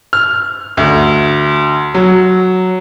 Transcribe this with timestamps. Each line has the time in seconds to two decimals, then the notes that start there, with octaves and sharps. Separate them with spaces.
0.13 F6
0.77 D2
1.94 F#3